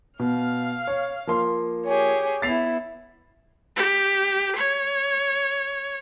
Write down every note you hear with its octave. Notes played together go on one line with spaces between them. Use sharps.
B2 F5 F6
C#5
F3 A#3 C6
G4 G#4 C#5
B3 E4 A6 C7 F7
G4
C#5